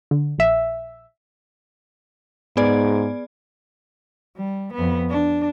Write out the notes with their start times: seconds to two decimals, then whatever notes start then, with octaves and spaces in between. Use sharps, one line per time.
0.11 D3
0.38 A#1 E5
2.57 G#2 B3 G#4 D5
4.37 G3
4.74 F2 B3
5.10 D4